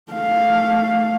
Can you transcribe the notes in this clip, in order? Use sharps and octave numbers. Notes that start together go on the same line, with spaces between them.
A3 F5